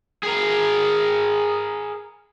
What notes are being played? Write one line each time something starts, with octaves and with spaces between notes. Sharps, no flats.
G#4 A#4